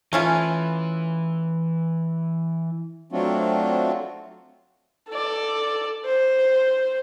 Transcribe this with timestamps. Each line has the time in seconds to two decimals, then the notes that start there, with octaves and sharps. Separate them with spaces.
0.13 E3 A3 C#4 F4
3.12 F#3 A3 C4 D4 F4 F#4
5.09 A4 D5
6.05 C5